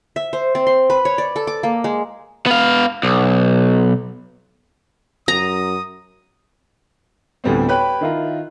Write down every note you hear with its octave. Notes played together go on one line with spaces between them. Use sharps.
E5
C5
C4
C6
B4
C#5
D5
A4
D6
A#3
G#3
B3 F5
B1
F#2 A#5 D#6
D2 A2 G3 B3 C4
G4 B4 C#5 G5 B5 F#6
D#3 E4 F4 A#4